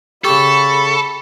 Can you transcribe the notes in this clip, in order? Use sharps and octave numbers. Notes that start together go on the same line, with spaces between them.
C#3 G4 A4 B5 C#6